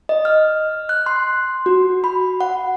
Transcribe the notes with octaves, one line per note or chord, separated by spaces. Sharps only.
D#5
F6
F#6
C6
F#4
B5
F#5